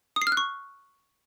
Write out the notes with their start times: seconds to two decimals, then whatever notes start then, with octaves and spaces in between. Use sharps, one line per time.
0.16 D#6
0.22 C7
0.27 F6
0.32 F#6
0.37 C#6